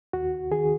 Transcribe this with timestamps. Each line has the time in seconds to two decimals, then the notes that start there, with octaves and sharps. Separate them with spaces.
0.13 D#2 F#4
0.51 D#3 G#4